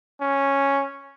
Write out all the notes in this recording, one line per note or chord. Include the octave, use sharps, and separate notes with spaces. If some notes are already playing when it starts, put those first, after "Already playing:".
C#4